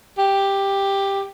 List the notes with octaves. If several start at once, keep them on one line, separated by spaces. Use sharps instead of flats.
G4